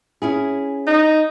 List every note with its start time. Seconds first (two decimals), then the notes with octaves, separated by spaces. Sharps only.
0.22 C#4 E4 G#4
0.87 D#4